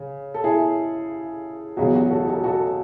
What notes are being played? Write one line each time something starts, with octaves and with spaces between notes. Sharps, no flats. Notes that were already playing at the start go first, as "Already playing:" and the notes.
Already playing: C#3
A4
E4 G#4
E2 C#3 F#3 F#4
F#4
F#4 A4
F#4 A4
F#4 A4